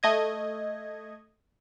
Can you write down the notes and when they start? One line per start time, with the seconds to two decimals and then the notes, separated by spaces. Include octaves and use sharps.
0.03 A3 D#5 G#6